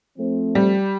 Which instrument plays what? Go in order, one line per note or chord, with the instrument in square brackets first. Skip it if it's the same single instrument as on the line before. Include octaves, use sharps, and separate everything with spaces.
[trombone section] F3 A3 C4
[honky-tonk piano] G3